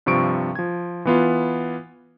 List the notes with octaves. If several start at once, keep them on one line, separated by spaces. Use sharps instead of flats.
G2 C3 F3 C#6 D7
F3 G#6
E3 B3 F4